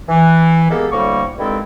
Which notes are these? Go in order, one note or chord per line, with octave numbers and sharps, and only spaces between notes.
E3
G#3 A#3 B3 G4 A4
D2 A2 G3 A#3 C#6
G2 D#3 G#3 C4 E4 A4